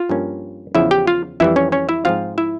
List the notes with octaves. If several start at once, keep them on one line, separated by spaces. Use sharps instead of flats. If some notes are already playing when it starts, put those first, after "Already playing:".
Already playing: F4 F5
G2 F3 A#3 C#4
E2 C#3 F3 E4 E5
G4 G5
F4 F5
F2 E3 G3 E4 E5
C#4 C#5
C#4 C#5
E4 E5
G#2 F3 C4 F4 F5
E4 E5